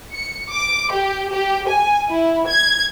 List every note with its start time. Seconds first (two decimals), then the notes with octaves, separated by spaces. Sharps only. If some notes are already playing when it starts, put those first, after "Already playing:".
0.13 C#7
0.51 D6
0.92 G4
1.31 G4
1.67 G#5
2.10 E4
2.47 G#6